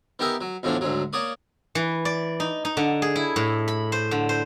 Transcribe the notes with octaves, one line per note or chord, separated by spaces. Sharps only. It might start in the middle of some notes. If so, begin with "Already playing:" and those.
B3 D#4 G4 A#4 E5 G#5
F#3
E2 A2 F3 F#3 D4
D2 G#2 F#3
A#3 C#5 D5 D#6
E3
D5
D#4
D#4
D3
G#4
E4
A2
B5
C5
D3
C5